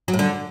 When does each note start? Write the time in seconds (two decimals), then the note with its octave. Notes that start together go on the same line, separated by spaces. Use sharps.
0.08 F#3
0.14 A2
0.19 D3